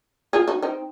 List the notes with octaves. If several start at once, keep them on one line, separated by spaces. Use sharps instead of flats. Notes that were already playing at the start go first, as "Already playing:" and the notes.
F4 G#4
D#4 F#4
C4 D#4